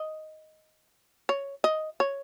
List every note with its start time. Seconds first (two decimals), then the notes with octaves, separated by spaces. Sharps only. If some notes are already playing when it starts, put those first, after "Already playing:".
Already playing: D#5
1.29 C#5
1.64 D#5
2.00 C#5